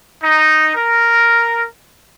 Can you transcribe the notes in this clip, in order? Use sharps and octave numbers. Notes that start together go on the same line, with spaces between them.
D#4
A#4